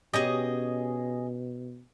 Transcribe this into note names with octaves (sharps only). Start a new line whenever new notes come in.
B2 C#4 G4 G#4 D#5